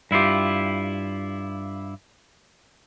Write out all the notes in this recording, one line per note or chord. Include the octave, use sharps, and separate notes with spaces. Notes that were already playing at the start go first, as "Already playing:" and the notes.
G2 E4 F4 G4